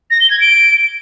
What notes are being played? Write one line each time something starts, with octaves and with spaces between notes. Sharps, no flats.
A#6
G7
G#6
D7